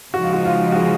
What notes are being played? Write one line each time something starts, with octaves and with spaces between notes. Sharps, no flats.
C#3 F3 G#3 D#4 F#4
F4
F#4
F4
F#4
G#4